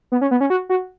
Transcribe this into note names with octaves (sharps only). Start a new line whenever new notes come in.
B3
C#4
B3
C#4
F#4
F#4